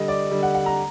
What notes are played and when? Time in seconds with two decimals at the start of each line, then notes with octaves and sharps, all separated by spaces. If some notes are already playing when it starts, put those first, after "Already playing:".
Already playing: D3 G3 D#5
0.08 D5
0.31 D3 G3
0.43 F#5
0.55 F#5
0.66 A#5